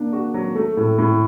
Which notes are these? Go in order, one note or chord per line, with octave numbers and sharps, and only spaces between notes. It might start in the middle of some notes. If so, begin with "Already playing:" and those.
Already playing: A#3 D4
F#4
F#3
A3
A2
A2